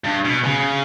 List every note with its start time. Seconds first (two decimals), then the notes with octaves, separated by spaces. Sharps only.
0.04 G2
0.25 B2
0.44 C#3